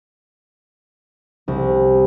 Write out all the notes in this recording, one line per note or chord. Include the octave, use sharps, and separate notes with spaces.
C2